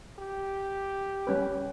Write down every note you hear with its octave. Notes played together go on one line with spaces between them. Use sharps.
G4
G3 C#4 B4